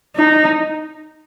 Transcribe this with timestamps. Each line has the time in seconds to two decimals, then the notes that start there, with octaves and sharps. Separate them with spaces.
0.16 D#4